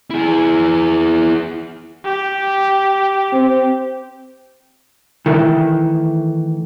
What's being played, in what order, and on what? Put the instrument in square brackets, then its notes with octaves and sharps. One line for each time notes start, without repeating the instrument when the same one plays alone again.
[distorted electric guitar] E4 G#4
[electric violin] G4
[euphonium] C4
[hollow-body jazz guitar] D#3 E3 A3